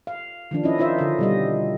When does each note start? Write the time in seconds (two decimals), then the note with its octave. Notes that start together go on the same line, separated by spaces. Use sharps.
0.07 F5
0.51 D#3 F3 D4
0.63 C#4 E4 D#5
0.78 D4 D#4 F4 C5 E5
0.98 D3 D#5
1.18 B2 G3 D#5